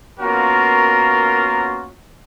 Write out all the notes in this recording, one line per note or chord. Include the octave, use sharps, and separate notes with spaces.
A#3 B3 C#4 F4 F#4 A#4